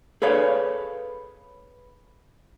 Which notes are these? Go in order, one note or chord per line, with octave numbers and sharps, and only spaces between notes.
G#4 A4 B4 C#5 F5